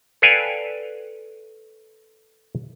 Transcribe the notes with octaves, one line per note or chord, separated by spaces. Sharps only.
A4 B4 D5 F5 G5 G#5